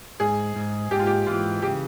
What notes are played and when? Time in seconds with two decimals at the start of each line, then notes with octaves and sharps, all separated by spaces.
0.20 G#2 G#4
0.56 G#2
0.91 G#2 G4
0.99 F4
1.07 G4
1.26 E3 F4
1.62 C#3 G4